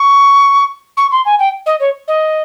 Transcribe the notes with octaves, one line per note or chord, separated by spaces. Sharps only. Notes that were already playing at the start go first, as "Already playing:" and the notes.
Already playing: C#6
C#6
C6
G#5
G5
D#5
C#5
D#5